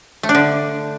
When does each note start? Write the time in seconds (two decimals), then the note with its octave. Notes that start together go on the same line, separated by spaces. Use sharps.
0.23 A3
0.29 D4
0.35 D3